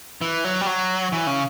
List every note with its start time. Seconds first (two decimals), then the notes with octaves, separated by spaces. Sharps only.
0.21 E3
0.44 F#3
0.61 G3
0.67 F#3
1.12 E3
1.27 C#3